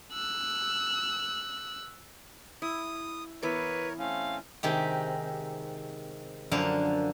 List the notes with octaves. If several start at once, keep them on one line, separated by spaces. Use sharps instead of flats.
E6 F#6
E4 D#6
E3 B3 A#4 B4 C#5 D6
A3 C4 C#4 F5
C3 D#3 G#3 G4
F#2 D3 F3 A#3 D4 F5